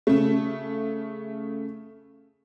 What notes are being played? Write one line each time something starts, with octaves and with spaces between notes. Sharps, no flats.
C#3 A3